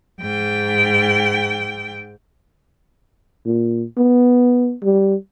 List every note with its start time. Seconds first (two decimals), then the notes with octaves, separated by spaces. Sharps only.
0.20 G#2 G5
3.46 A#2
3.97 B3
4.83 G3